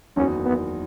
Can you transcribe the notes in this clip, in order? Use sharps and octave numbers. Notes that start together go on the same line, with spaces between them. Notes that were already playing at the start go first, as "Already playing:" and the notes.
F#1 E2 D#3 F#3 C#4
B3